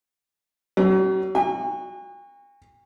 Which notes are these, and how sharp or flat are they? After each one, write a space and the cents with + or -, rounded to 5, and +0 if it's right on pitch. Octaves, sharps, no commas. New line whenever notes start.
F#3 +45 C#4 +0
F#4 +0 G#5 -45